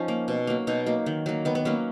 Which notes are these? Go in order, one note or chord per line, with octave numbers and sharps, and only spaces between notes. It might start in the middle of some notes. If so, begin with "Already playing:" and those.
Already playing: F3 C#4 D#4
A#3
B2
F#3 A#3
B2 D#4
F#3 A#3
D#3
F#3 A#3
D#3 B3
B3
F#3 A#3 C#4